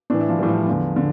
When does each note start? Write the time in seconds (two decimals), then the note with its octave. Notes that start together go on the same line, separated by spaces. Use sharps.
0.10 A2 E3 D4
0.20 E4
0.29 F3
0.39 A2 E3 G3
0.49 F3
0.66 E2 D3 F3
0.96 D3